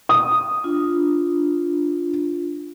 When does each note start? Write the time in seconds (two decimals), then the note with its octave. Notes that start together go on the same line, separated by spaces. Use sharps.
0.09 D#6
0.64 D4 F4